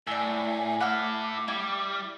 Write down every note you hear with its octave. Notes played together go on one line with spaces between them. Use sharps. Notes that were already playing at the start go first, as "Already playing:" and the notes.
A2 A3 D5 G#5 E6
E4 A4 F#5 D6 F6
G3 E4